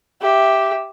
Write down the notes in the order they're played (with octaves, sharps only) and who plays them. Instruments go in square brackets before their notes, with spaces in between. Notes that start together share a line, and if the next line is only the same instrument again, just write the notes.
[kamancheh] G4 E5